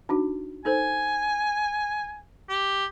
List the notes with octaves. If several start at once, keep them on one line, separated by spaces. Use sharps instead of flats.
D4 D#4 F#4
D#4 A4 C5 G#5
G4